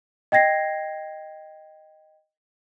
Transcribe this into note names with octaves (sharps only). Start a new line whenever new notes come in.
D#5 G5 G#6 A#6 C7